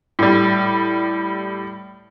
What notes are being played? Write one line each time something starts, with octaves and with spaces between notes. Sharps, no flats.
A2 G3